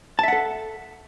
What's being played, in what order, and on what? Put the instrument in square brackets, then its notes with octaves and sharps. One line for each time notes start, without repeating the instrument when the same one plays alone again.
[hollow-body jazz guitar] A5
E5
F#5
A4